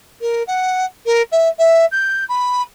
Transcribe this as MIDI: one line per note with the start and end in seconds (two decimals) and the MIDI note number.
0.21 0.43 70
0.47 0.85 78
1.06 1.22 70
1.32 1.48 76
1.59 1.86 76
1.92 2.24 91
2.29 2.62 83